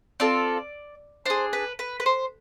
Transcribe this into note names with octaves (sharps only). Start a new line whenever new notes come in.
C4 F4 A4 D5
D4 G#4 C5
B4
B4
B4
C5